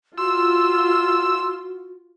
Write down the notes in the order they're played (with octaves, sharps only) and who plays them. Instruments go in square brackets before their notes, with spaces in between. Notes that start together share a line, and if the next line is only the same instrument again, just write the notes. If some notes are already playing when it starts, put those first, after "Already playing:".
[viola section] F4 [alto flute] F#4 [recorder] C6 [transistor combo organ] E6